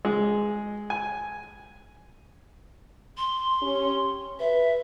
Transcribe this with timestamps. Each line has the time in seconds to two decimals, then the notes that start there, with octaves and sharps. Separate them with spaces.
0.05 G#3
0.90 G#5
3.18 C6
3.61 C#4 G4
4.40 B4 E5